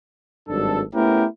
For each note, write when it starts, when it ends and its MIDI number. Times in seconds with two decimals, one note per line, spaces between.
0.48 0.81 32
0.48 0.81 43
0.48 0.81 54
0.48 0.81 62
0.48 0.81 69
0.94 1.25 57
0.94 1.25 59
0.94 1.25 61
0.94 1.25 64
0.94 1.25 67
0.94 1.25 70